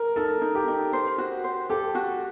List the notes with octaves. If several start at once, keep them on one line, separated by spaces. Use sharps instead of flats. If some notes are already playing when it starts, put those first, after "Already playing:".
Already playing: A#4
D#4 A4
D#4
G4
D#4
C5
F#4
C5
G4 A4
F#4